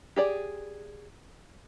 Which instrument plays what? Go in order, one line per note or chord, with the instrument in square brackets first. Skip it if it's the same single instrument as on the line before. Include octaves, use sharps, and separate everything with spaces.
[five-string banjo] G4 G#4 D5